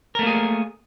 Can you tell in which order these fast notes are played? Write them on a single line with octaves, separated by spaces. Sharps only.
A#4 A3 A#3 G#4